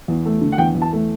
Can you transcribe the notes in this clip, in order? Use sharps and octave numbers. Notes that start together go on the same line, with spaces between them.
E2
A3
D3
F#5
E2 G5
E2
A5
A3